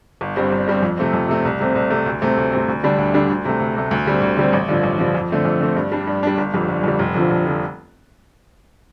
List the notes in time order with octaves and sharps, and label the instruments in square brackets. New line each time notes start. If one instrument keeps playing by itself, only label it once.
[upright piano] G1
G2 G3 C4
G1
G2 G3 C4
F2
C3 A3 C4
F2
C3 A3 C4
C2
C3 A3 C4
C2
C3 A3 C4
D2
C3 A3 C4
D2
C3 A3 C4
D2
D3 G3 D4
D2
D3 G3 D4
D2
C3 A3
D2
C3 A3
D2
D3 G3 C4
D2
D3 G3 C4
A1
G2 D3 F3
A1
G2 D3 F3
F2
D3 A3 C4
F2
D3 A3 C4
G2
G3 D4
G2
G3 D4
G1
F2 D3 G3
G1
F2 D3 G3
F1
F2 D3 F3
F1
D3 F3